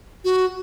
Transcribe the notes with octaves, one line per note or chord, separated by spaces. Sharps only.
F#4